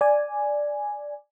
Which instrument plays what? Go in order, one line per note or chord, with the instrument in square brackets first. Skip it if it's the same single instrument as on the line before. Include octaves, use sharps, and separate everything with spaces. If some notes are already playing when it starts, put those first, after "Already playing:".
[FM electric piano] D5 G#5